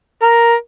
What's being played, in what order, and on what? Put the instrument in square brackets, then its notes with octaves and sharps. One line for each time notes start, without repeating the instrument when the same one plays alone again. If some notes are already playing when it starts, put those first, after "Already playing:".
[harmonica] A#4